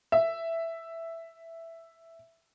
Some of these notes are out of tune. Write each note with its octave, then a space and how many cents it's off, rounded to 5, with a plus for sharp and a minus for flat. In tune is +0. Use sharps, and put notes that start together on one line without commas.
E5 +5